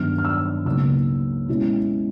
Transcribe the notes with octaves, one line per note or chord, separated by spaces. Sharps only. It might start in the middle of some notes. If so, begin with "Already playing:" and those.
Already playing: G2 D#3 F#3 B3 D4 F6
F6
E6
C#2 B2 F#3 A#3 D#4 E6
B2 G#3 C#4 E4